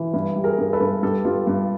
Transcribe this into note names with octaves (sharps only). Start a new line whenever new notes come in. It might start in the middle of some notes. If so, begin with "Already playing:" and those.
Already playing: E3
G2 E4
G3
G#4 A#4
G2
A4 B4
G2
G2 G4 A4
G2 F4 G4
G2